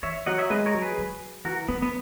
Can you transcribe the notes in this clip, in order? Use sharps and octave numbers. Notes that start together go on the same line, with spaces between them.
E3 C#5 E5
F#3 D#5 F#5
C#5 E5
G#3 B4 D#5
A#4 C#5
F#3
G#4 B4
F#3
E3 F#4 A#4
F#3 B3
B3